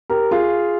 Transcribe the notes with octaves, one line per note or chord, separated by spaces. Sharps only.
G4 A#4
F4 G#4